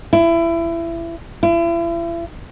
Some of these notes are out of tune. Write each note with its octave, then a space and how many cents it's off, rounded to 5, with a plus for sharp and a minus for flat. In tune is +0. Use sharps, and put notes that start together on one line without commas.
E4 +25
E4 +40